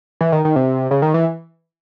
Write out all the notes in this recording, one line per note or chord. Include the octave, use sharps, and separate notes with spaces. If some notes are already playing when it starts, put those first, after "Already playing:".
E3
D#3
D#3
C3
C#3
D#3
E3